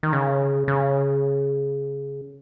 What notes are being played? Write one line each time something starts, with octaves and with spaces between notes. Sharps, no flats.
D#3
C#3
C#3